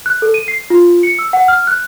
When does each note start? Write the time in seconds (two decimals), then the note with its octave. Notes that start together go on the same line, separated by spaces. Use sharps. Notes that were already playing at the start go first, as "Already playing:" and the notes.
0.06 F#6
0.22 A4
0.34 D#7
0.48 C7
0.70 F4
1.03 C#7
1.19 E6
1.33 F#5
1.48 F6
1.67 F#6